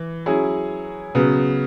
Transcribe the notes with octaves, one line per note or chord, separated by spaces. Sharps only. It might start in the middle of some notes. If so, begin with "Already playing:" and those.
Already playing: E3
F#3 C#4 E4 G#4
C#3 F#3 B3